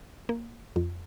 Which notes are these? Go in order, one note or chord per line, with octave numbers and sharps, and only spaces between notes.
A#3
F2